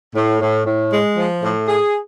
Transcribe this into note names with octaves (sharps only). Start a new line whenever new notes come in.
A2
A2
A2
G#3
F3
A2
G#4